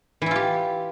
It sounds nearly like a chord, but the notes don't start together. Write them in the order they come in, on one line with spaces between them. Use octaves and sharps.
E3 E4 F4 G4